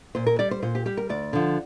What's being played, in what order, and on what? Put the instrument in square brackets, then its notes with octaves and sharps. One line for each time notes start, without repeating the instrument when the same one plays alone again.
[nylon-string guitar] A#2 C5
A#4
G3 D5
C5
A#2 C5
G4
G3 G4
A#4
D2 D5
D3 F3